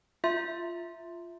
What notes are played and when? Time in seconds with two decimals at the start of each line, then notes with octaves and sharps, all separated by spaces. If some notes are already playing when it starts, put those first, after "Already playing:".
0.24 F4 E5 C6